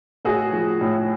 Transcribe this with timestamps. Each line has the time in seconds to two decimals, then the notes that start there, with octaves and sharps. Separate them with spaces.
0.25 A2 F#4 G#4
0.52 F3
0.81 A2